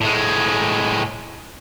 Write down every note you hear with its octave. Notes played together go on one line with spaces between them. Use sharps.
A2 G#3